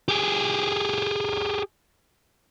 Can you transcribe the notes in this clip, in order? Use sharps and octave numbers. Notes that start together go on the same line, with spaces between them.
G4 G#4